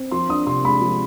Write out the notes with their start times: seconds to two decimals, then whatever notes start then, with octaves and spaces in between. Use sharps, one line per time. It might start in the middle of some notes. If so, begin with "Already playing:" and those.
Already playing: C4
0.11 F3 C6
0.29 D4 D#6
0.47 C3 C6
0.65 G#3 B5
0.81 F3